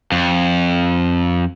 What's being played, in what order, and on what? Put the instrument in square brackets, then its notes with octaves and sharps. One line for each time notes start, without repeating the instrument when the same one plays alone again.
[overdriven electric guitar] F2